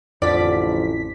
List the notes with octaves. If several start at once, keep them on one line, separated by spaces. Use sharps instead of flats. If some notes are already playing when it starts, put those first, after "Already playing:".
A1 F2 D3 F3 D5 B6